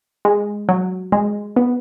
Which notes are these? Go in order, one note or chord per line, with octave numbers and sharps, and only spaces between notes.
G#3
F#3
G#3
B3